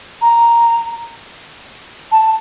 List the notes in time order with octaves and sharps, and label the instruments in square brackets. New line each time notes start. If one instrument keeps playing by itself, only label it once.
[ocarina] A#5
A5